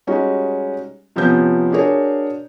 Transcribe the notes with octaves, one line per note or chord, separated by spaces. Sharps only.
G3 G#3 C#4 D#4 F#4
C3 F3 B3 C#4 G6
D4 F#4 G#4 A#4 C#5